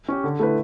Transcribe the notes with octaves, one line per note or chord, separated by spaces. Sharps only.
C#4 G4
D3
A3 E4 B4